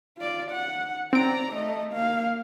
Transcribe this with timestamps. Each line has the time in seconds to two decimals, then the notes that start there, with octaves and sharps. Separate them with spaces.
0.18 F4 D5
0.52 F#5
1.13 C4 D5 A#5 D7
1.53 A3 D#5
1.93 A#3 F5